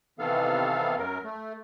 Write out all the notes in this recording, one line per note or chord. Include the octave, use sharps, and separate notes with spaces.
C3 D#3 E3 B3 A4 F5
F#2 F#3 A#4
A3